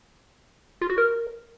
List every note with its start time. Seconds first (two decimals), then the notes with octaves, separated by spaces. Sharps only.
0.81 F4
0.90 F#4
0.98 A#4